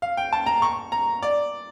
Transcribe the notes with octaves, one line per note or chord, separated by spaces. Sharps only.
F5
G5
A5
A#5
C#6
A#5
D5